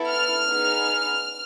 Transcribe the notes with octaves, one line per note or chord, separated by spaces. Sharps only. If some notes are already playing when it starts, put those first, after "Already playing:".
Already playing: B3 E4 A4
F6
B3 D#4 G#4